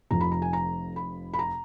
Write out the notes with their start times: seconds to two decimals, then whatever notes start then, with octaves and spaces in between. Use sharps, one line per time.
0.11 F1 F2 F3 A#5
0.21 B5
0.32 A#5
0.42 G#5
0.53 A#5
0.96 B5
1.34 B5
1.39 A#5